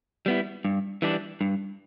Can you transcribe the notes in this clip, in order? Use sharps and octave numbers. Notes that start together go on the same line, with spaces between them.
G3 B3 E4
G2
E3 G3 D4
G2